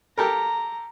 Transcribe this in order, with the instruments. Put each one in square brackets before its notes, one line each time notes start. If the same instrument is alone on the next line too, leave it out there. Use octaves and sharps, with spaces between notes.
[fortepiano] G4 A4 A#4 [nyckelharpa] A#5